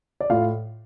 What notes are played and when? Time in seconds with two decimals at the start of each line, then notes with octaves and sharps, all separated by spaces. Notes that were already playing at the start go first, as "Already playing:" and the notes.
0.21 D5
0.30 A2 F4 F5